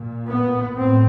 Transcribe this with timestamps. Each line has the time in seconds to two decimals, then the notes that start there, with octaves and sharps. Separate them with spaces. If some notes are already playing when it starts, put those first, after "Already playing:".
Already playing: A#2
0.29 B3
0.77 A2 C4